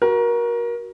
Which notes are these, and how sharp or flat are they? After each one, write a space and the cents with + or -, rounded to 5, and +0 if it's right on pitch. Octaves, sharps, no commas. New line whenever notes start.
F#4 +0 A#4 +25